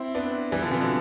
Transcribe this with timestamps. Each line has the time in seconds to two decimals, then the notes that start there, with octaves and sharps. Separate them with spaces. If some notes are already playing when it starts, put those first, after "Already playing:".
Already playing: C4 E4
0.15 B3 D4
0.52 E3 G3
0.62 D3 F3
0.71 C3 E3
0.81 B2 D3